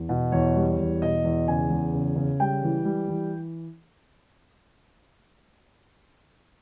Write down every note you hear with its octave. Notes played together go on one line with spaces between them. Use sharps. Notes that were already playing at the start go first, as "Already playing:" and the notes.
Already playing: E2
B2
E2 C#5
G3
E2
B2 D#5
E2
C#3 G#5
E2
C#3
C#3
G3 G5
E3
G3
E3